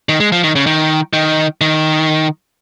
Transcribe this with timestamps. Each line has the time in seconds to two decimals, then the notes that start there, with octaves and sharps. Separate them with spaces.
0.09 D#3
0.20 G#3
0.32 F3
0.44 D#3
0.56 C#3
0.67 D#3
1.13 D#3
1.61 D#3